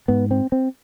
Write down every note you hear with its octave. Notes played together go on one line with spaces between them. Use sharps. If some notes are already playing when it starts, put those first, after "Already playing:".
G#2 B3
C4
C4